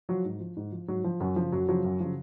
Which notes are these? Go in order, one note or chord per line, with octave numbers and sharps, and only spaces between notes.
F3 F#3
G#2
F3
G#2
F3
G#2 F#3
F3
F#2 F#3
C#3 F3
F#2 F#3
C#3 F3 F#3
F#2
C#3 F3